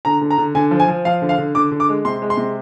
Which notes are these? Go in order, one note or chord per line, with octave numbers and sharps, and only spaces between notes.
D3 A#5
D3
A#5
D3
D3 G#5
F3
G#5
F3
F3 F5
D3
F5
D3
D3 D6
D3
D6
G#3
C3 C6
G#3
C6
C3